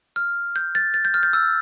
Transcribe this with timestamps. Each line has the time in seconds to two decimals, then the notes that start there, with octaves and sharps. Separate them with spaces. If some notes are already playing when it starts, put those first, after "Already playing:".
0.16 F6
0.56 G6
0.75 A6
0.94 A6
1.05 G6
1.14 F6
1.23 G6
1.33 E6